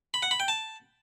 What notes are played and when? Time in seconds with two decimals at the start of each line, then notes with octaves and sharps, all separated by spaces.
0.14 B5
0.23 F#5
0.31 B5
0.40 G5
0.48 A5